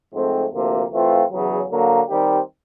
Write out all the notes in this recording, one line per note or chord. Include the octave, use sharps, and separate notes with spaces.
G#2 F3 A3 C4
D2 C3 F3 A#3
E3 A3 C4 F4
E2 C#3 F#3
D3 F#3 A#3
D#3 G3 C4 D#4 G4